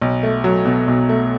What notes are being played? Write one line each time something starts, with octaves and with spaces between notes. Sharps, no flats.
B1
A3
F#3
B2
B1
A3